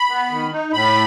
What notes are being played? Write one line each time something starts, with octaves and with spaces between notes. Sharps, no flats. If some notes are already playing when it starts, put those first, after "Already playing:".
Already playing: B5
B3
D#3
D#4
A2 B5